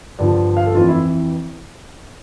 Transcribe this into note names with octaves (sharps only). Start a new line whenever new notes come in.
G2 D3 F3 D5
F5
A4
F2 E3 F4
E4